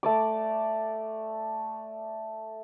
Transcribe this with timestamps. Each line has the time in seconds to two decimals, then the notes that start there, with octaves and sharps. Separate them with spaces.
0.03 A3 D5 D6